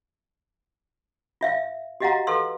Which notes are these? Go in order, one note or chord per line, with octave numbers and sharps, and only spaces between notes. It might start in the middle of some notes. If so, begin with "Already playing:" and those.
F4 E5 F5
F#4 G4 D#5 F5 F#5 A#5
A4 B4 F5 C6 E6